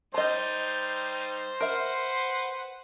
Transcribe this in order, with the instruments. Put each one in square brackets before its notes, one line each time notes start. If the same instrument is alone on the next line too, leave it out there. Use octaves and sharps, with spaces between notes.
[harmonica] G3 D#4 [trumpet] C5 [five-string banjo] D#5 A#5
[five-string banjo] A#4 E5 [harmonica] B4 F#5